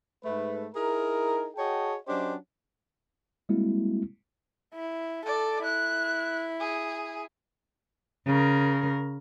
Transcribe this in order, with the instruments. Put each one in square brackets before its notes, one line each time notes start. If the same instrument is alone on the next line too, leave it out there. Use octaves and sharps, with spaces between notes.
[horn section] G#2 A3 B4
D#4 E4 G#4 A#4
F#4 G#4 C#5 D#5 G5 A5
F#3 C#4 D4 G4 C5 D#5
[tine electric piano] G3 G#3 A#3 C4 E4 F#4
[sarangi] E4
[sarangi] A4 [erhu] D5
[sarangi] E4 [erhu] F#6
[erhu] G#4
[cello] C#3 A#4